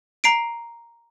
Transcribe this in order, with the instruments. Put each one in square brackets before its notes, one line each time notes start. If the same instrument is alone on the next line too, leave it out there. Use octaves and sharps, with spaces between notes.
[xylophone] A#5 C7 D7